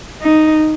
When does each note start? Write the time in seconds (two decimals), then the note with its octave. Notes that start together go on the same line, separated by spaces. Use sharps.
0.21 D#4